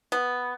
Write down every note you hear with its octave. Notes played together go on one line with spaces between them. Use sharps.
B3